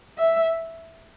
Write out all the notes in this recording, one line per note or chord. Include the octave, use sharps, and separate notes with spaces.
E5